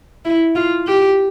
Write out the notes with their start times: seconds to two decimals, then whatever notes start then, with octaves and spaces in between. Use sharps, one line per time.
0.25 E4
0.55 F4
0.87 G4